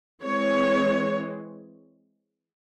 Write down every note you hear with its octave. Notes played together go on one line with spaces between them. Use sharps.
E3 G#3 C4 C#5